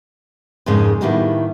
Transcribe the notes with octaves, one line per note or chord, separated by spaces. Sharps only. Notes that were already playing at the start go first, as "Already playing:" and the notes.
F2 G#2 C#3 G#3 A#3 C#4
A2 D#3 G3 A#3 B3 E4